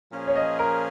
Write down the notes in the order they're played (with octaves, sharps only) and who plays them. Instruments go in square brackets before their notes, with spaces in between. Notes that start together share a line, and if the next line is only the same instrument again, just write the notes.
[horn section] A#2 F3 C#4 G#4
[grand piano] C#5
D#5
A#4